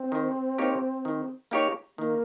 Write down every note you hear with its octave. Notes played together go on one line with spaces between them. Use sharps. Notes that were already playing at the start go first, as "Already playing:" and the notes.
Already playing: C4
D#3
A#3 D#4 G4 C#5
D#3
A#3 D#4 G4 C#5
D#3 A#3